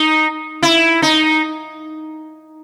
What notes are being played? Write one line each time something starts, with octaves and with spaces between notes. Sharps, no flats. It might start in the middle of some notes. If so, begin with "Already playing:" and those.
Already playing: D#4
E4
D#4